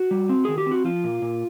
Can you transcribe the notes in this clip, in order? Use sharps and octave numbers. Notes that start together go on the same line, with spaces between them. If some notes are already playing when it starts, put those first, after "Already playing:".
Already playing: F#4
G3
C4
D#3 G#4
G4
C4
F#4
F3 F4
A#2
A#2